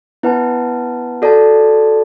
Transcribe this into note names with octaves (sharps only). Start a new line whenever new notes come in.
B3 E4 B4 F#5 A5
F#4 A4 D5 A5